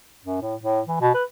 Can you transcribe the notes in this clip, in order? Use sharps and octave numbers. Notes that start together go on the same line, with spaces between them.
F#2
A2
A2
E3
B2
B4